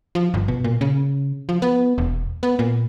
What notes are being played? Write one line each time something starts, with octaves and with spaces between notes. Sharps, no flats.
F3
G1
B2
A#2
C#3
F3
B3
E1
B3
A#2